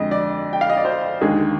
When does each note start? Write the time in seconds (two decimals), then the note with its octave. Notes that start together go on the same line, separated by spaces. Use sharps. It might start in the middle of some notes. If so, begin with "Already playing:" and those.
Already playing: F2 D3 G#3 D#5
0.11 D5
0.53 G5
0.61 F5
0.70 D#5
0.77 D5
0.85 C5
1.21 D#2 D3 G#3 G#4